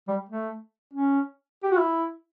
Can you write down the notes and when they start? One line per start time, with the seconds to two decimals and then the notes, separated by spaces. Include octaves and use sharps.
0.08 G3
0.29 A3
0.93 C#4
1.63 G4
1.71 F#4
1.77 E4